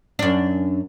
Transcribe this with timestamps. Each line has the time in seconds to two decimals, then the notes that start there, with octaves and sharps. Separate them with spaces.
0.19 F#2 D4